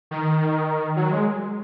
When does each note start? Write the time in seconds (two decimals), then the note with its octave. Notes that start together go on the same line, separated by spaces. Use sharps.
0.11 D#3
0.96 F#3
1.11 G#3